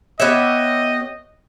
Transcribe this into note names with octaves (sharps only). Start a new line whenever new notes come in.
B3 G4 C#5 D#5 E5